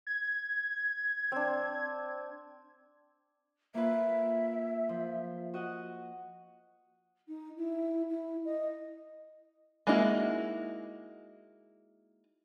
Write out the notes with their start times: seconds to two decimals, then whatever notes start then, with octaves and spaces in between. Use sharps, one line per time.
0.07 G#6
1.32 C4 D4
3.74 A#3 F4 B4 E5
4.89 F3
5.54 F#4 D#5 F#5
7.28 D#4
7.56 E4
8.09 E4
8.45 D#5
9.87 G#3 A#3 D#4 E4 F#4